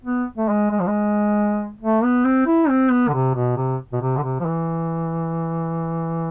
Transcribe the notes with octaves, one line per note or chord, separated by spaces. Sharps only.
B3
A3
G#3
G#3
F3
G#3
A3
B3
C4
E4
C4
B3
D3
C3
B2
C3
B2
C3
D3
C3
F3
E3